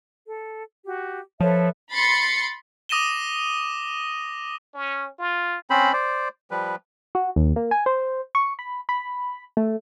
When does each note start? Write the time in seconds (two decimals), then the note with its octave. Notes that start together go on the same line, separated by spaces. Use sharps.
0.25 A4
0.84 F#4 G4
1.40 F3 A4 B4 C#5 E5
1.91 B5 C6 A6 C7 C#7
2.89 D6 D#6 A#6 D#7 E7 G7
4.75 C#4
5.19 F4
5.70 C4 C#4 C5 B5
5.93 C5 D5
6.51 F3 G3 B4
7.15 F#4
7.36 D#2
7.56 A#3
7.71 G#5
7.86 C5
8.35 C#6
8.59 B5
8.89 B5
9.57 A3